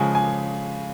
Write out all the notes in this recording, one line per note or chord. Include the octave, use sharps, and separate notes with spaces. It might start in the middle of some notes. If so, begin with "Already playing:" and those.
Already playing: C#3 F3 G#3 G#5
G#5